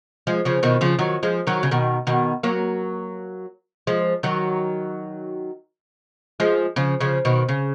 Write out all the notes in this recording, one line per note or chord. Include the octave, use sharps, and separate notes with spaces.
F3 G#3
C#3 F3
B2 D#3
C#3 F3
D#3 F#3
F3 G#3
D#3 F#3
C#3
B2 D#3
B2 D#3
F#3 A#3
F3 G#3
D#3 F#3
F3 G#3
C#3 F3
C#3 F3
B2 D#3
C#3